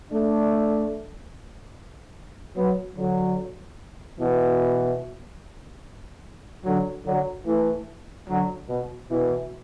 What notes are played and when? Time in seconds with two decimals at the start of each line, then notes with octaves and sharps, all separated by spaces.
0.11 A3 D4
2.56 F#3 B3
2.97 D3 F#3
4.19 B2 E3
6.65 D3 F#3
7.05 D3 F#3
7.46 E3 A3
8.27 D3 F#3
8.68 B2
9.10 B2 E3